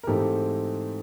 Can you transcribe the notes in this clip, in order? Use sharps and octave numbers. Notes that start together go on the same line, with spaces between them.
A#4
G#2 E3 A3 C4 D#4 G4 A4